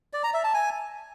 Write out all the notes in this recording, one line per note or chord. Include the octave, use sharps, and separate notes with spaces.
D5
A#5
E5
A5
G#5